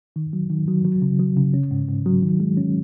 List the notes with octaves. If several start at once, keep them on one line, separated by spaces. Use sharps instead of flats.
D#3
F#3
D#3
F#3
F#3
C#3
F#3
C#3
C#4
G#2
G#2
F#3
D#3
G#3
C#4